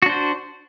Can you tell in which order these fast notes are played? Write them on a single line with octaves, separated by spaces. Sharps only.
F#4 D4 C5